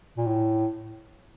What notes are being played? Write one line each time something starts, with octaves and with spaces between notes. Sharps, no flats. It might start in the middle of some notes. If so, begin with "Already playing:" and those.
A#2
A2